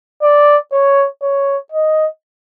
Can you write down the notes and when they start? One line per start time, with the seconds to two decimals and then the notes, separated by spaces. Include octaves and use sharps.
0.22 D5
0.72 C#5
1.22 C#5
1.72 D#5